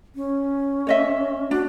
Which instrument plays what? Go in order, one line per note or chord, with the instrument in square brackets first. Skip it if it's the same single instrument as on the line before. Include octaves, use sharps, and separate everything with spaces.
[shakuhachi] C#4
[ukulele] C#5 D#5 E5
[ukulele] D4 [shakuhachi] F#4